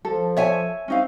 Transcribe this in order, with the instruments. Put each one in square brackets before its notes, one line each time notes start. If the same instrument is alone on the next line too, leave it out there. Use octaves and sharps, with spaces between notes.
[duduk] F3 [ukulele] A4
[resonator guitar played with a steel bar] C#5 E5 G#5
[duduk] C4 [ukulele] C#4 D#4 F5